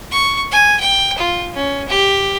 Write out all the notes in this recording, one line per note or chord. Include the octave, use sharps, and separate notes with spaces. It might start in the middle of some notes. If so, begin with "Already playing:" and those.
C#6
G#5
G5
F4
C#4
G4